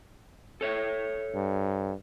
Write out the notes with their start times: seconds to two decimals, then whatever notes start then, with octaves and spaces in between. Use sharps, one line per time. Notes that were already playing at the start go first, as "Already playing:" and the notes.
0.61 A4 C#5 E5
1.34 G2